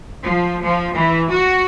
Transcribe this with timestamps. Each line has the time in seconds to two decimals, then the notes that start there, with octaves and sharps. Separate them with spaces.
0.24 F3
0.63 F3
0.94 E3
1.31 F#4